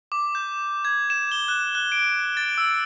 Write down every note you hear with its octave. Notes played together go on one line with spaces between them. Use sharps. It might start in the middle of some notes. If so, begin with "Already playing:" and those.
D6
G6
G#6
E7
G7
F#6
F#6
D7
A6
E6